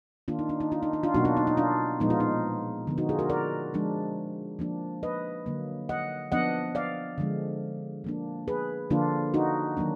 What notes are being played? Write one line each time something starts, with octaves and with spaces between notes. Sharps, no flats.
D#3 A#3 D4 F4
D#4
D4
D#4
D4 F4
D#4
D#4
D4 F4
B2 F#3 A#3 D4 D#4 F#4
D4 F4
D#4
D#4
D4 F4
A#2 F3 G#3 B3 D#4
F4
D#4
D3 F3 B3
D#4 F#4
F4 G#4
F#4 A#4
A#4 D5
F3 G#3 D4
F3 A#3 D4
B4 D#5
D3 F#3 A#3
D#5 F#5
F3 B3 D4 D#5 F#5
D5 F5
D3 F3 G#3
F3 A#3 D4
G#4 B4
D3 F3 A#3 D4 F4
D#4 F#4
D#3 F#3 A#3 D4